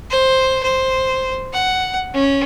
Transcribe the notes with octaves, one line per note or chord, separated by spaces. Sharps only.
C5
C5
F#5
C#4